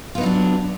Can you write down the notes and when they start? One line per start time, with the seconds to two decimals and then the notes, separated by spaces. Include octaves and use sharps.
0.15 F4
0.18 B3
0.21 D#4
0.23 F#3
0.26 D4